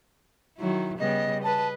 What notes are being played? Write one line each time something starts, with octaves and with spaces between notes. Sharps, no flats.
D#3 F#3 E4
C#3 G3 B3 D#5
B4 D#5 A5